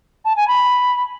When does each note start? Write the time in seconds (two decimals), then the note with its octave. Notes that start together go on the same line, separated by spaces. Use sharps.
0.25 A5
0.36 G#5
0.48 B5